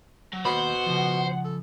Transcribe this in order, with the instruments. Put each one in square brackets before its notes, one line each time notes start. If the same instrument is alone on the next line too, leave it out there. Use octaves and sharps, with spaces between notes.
[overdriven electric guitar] F#3
[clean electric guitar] D#2 B5 [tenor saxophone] B2 [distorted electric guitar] C5 [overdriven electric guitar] F#5
[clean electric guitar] C#3 F3
[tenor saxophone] A4